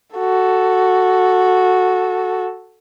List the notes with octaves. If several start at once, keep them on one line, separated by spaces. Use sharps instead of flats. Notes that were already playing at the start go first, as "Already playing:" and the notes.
F#4 A4